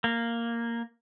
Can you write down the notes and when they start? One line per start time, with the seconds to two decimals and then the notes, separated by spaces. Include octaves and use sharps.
0.04 A#3